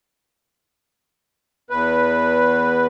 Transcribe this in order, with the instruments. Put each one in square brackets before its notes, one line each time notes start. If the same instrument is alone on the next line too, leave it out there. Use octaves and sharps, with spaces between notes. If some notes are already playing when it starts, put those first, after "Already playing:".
[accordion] E2 B4